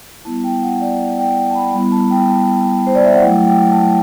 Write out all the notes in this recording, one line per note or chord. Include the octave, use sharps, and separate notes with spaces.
G3 B3 E4 A5
G5
F#5
D5
G5
A5
B5
G3 B3 E4 B5
A5
G5
A5
C5
D5
E5
F#5
F#3 A3 E4 G5
G5
A5